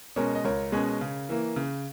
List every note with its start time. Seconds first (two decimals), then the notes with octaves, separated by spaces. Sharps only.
0.16 B2 G#3 C#4 A#4 C#5
0.35 D#5
0.44 C#2 A#4 C#5
0.72 B2 G#3 C#4
1.01 C#3
1.29 E3 A#3
1.56 C#3